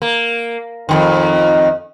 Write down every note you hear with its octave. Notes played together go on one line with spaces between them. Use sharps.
A#3
F2 A2 D#3